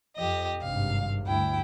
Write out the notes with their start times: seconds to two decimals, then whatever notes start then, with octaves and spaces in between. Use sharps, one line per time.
0.16 F2 G4 D#5
0.62 G#1 G2 C3 F5
1.27 D2 G2 E4 G5